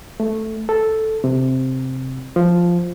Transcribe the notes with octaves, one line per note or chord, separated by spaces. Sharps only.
A3
A4
C3
F3